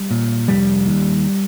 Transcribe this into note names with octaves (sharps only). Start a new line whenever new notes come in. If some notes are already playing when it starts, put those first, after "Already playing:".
Already playing: G3
A#2
F1 G3
D#2